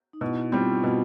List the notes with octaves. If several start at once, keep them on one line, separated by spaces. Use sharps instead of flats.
D#4
B2 E4
G3 C4 F4
B2 F#4